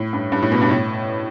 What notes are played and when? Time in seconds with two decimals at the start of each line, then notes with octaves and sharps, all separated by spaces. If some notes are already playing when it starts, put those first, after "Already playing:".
Already playing: A2
0.13 G2
0.32 G2
0.42 A2
0.52 B2
0.61 G2
0.71 A2